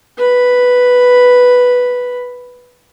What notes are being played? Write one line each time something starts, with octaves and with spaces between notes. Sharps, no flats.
B4 B5